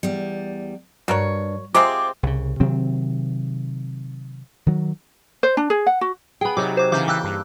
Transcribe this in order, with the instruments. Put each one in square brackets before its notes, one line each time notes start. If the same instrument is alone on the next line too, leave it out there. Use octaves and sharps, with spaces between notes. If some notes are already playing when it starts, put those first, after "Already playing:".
[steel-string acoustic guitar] E2 G3
[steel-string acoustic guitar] G2 [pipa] F#4 A#4 C#5
[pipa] C3 G#3 C4 [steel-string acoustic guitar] F4 G#4 C5 [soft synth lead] D6
[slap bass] C2 C#3
C3 D#3 F#3 C4
D#3 F#3
[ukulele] C5
D4
G#4
F#5
F#4
[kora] B3 G#4 [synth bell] G5 B5
[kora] C3 D#4 [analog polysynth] F#3 [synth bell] D6
[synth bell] C5 D6
[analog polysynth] C#3 E3 [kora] A#3 [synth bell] D6 G6
[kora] G5 [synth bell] D6 E6 F#6
[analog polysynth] G2